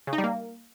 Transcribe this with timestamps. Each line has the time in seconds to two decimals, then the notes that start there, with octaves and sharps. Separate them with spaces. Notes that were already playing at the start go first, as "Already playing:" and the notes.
0.07 C#3
0.13 D#4
0.18 G3
0.24 A#3